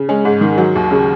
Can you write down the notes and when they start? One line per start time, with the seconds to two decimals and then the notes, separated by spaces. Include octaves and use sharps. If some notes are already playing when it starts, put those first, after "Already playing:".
Already playing: C#3
0.09 G#3 C#4
0.25 G#2
0.41 D#3
0.58 F#3
0.75 D#2
0.91 C#3